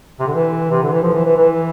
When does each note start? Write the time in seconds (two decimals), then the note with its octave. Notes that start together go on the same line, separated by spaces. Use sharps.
0.19 C3
0.27 D3
0.35 E3
0.71 C3
0.82 D3
0.93 E3
1.03 F3
1.14 E3
1.25 E3
1.37 E3